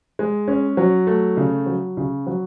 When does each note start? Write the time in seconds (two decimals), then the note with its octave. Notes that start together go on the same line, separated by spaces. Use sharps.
0.19 G#3
0.48 C#4
0.77 F#3
1.07 A3
1.37 C#3
1.66 F#3
1.97 C#3
2.27 F#3